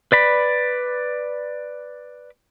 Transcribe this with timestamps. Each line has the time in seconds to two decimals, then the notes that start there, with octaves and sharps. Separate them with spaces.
0.12 B4 D5 B5